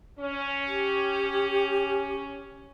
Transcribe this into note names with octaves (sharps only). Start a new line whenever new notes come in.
C#4
G4